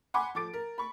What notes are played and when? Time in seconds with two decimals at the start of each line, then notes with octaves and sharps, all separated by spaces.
0.14 F#5 G#5 B5 C6 D6
0.35 F3 A3 D6 A6 D7
0.54 A#4
0.78 B5 C#6